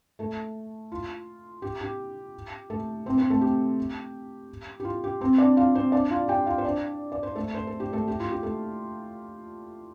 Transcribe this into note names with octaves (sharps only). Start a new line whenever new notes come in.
A3 A4
F4
G4
G4
A3 A4
C4 C5
C4 C5
A3 A4
G4
G4
F4
G4
C4 C5
D4 D5
F4 F5
C4 C5
D4 D5
F4 F5
G4 G5
F4 F5
C5
D4 D5
D5
C5
A3 A4
C5
A4
G4
A3 A4
G4
F4
G4
A3 A4